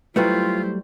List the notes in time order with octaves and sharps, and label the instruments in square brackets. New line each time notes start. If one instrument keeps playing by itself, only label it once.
[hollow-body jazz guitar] F#3 G3 A3 [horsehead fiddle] E4 C5 [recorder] F4 [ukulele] B4 G5